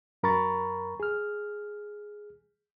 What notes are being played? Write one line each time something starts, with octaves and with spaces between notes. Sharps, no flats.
F#2 A#4 A#5 B5 C#6 A6
G#4 F6